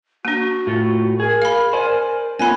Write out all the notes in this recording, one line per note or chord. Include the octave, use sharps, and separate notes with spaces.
A#3 D4 F#4
A2 A3 F4
G#4 A#4
F5 B5
C5 D5 G#5
A3 B3 C#4 F4 G#5 B5